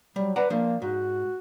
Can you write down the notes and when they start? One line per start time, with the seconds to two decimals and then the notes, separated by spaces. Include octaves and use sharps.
0.16 F#3 G3
0.36 B4 D5 F#5 A#5
0.50 F3 A#3 D4
0.82 G#2 F#4